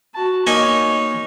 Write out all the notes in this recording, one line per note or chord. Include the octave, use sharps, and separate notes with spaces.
F#4 A5
A#3 D#4 C#5 G#5 C#6